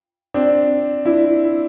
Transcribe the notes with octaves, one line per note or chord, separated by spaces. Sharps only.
C4 D4
D4 E4